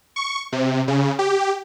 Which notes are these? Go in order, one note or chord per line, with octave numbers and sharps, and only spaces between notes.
C#6
C3
C#3
G4